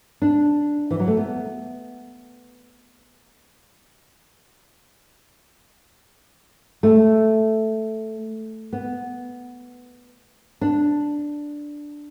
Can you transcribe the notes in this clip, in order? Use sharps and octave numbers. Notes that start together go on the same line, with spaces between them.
D4
E3
F#3
A3
B3
A3
B3
D4